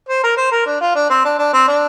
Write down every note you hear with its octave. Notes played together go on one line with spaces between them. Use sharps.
C5
A#4
C5
A#4
D4
F4
D4
C4
D4
D4
C4
D4